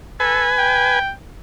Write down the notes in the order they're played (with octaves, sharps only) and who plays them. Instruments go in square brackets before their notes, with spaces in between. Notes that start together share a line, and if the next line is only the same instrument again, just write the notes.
[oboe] A4 [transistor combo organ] B4 G#5
[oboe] G5